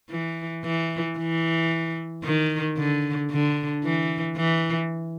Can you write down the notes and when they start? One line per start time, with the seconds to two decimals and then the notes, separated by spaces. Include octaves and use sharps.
0.10 E3
0.64 E3
1.18 E3
2.24 D#3
2.78 D3
3.31 D3
3.84 E3
4.37 E3